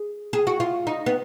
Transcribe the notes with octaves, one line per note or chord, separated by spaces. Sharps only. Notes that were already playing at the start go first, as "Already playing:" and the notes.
Already playing: G#4
G#4
F#4
F4
D#4
B3